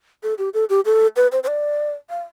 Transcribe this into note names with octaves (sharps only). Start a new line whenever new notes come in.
A4
G4
A4
G4
A4
B4
C5
C5
D5
F5